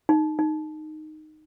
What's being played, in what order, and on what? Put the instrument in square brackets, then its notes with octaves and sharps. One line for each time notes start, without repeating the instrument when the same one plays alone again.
[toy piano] D#4
D#4